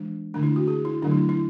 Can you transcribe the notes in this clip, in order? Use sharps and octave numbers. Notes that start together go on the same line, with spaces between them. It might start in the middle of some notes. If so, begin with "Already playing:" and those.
Already playing: E3 G#3 D4
D3 A3 D4
E4
F#4
G#4
E4
D3 F#3 A3 D4
E4
E4